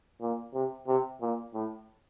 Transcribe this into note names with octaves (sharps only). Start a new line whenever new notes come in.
A#2
C3
C3
A#2
A2